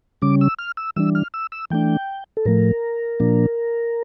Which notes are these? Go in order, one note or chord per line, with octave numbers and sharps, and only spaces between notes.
C#3 G3 C#4 D6
E6
F6
E6
E3 G3 D4 E6
F6
E6
E6
E3 A3 D4 G5
A4
A2 F3 A3 A#4
A#2 F3 A#3 D4